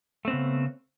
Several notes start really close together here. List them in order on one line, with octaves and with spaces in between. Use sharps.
A3 C4 B3 C#3